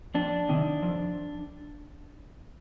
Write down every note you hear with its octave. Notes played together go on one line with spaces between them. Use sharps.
F2 D4
C3 D#3
F2